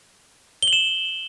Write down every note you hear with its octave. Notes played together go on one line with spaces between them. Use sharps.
G7
F#7
E7